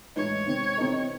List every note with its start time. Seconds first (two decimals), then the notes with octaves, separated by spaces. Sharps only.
0.16 A2 E3 G#3 D#4 C#5
0.47 C3 D#3 G#3 C4
0.78 C3 E3 C4 D#4 A4